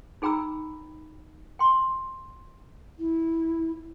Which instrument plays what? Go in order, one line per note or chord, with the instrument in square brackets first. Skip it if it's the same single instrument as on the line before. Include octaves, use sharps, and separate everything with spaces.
[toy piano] D#4 G#4 G5 A#5 B5 E6
G5 C6
[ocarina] E4